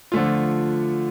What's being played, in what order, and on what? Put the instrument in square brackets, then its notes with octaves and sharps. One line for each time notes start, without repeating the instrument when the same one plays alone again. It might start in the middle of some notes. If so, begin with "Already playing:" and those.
[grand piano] D3 F3 A3 F4